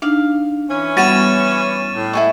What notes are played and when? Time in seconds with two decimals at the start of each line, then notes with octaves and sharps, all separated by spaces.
0.02 D4 D#4 F5
0.70 E3 C#4
0.97 G3 B3 F#4 C#5 A6 D#7 E7
1.93 A2
2.13 E4 D#5 F#5 G#5 C#6